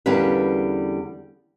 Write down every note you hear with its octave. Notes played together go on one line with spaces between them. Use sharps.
E2 D3 G3 A#3 C#4 B4